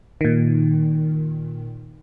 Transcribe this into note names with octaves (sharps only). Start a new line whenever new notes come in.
A#2 D#3